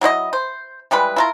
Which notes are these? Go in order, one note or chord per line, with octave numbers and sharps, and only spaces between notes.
F#3 E4 C5 D#5
C5
E3 G3 G#3 B4
E4 F4 A#4